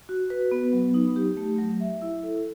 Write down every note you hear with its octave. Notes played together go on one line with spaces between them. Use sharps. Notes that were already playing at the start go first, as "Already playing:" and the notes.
F#4
B4
B3
F#3
D#4
G4
A3
F#3
E5
E4
A4